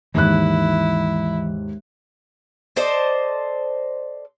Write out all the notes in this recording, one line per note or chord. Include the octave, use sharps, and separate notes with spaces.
D#2 G#2 E3 E4 F#6
A4 C5 D5 D#5